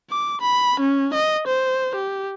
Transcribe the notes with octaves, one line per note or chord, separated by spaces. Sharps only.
D6
B5
C#4
D#5
C5
G4